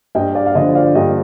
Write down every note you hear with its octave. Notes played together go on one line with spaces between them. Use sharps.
G2 D#5 G5
D5 F5
F5
D3 F3 C5 D#5
D5 F5
G2 D#5 G5